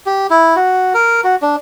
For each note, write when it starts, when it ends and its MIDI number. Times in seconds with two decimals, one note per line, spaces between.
0.06 0.27 67
0.30 0.56 64
0.56 0.93 66
0.94 1.21 70
1.24 1.36 66
1.42 1.56 62